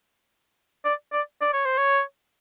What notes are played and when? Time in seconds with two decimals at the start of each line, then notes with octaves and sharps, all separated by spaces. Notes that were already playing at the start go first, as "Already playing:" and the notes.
0.85 D5
1.13 D5
1.41 D5
1.53 C#5
1.65 C5
1.78 C#5